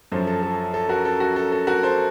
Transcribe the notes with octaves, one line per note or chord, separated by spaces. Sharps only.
F#2 F3 A4 C5
A4
A4
A4
F#4 A#4
A4
F#4
A4
A4
F#4 A#4
A4 C5